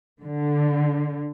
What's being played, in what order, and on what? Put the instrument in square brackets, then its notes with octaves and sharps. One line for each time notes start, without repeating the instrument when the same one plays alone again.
[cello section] D3